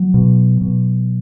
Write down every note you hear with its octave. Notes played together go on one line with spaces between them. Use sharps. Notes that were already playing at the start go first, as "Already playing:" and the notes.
Already playing: F#3
B2
B2